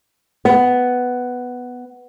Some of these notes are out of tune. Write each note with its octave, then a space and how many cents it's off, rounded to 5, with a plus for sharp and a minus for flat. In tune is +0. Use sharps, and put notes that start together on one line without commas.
B3 +5